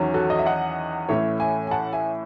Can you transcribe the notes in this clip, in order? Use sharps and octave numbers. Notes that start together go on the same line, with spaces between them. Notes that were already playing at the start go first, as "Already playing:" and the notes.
Already playing: E2 D#3 F#3 C#4
F#4 A4
D#5
E5
D#5 F#5
A2 E3 A3 C#4 C#5 E5
E5 G#5
G#5
F#5 A5
E5 G#5